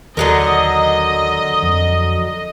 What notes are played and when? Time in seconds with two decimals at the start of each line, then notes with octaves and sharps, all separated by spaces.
0.17 D#2 D3 F#3 A#4 D#5
1.62 F2